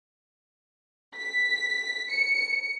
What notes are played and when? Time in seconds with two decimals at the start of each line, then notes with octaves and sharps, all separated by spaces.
1.16 B6
2.11 C#7